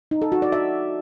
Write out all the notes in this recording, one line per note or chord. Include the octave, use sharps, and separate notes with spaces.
D#4
A4
F#4
D5
E5